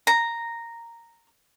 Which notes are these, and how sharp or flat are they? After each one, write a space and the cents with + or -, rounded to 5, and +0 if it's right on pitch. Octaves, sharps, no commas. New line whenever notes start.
A#5 -5